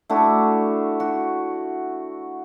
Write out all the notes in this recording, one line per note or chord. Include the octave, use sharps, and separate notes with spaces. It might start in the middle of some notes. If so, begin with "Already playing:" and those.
A3 D4 E4 F#4
F#4